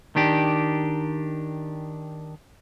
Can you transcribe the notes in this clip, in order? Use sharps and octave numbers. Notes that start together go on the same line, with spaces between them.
D#3 D4 G4